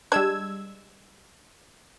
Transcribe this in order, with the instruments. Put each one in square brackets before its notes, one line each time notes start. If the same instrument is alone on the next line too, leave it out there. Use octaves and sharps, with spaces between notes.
[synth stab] G3 E6 G#6 [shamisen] G#3 D4